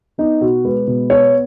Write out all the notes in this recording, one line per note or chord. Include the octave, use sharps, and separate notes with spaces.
B3 D#4
B2 F#4
G#3 B4
B2
B3 C#5